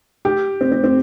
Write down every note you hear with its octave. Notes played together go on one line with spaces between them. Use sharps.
G4
C4
C4
C4